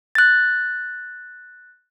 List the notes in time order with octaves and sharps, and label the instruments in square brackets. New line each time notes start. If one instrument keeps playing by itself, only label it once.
[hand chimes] F#6 A6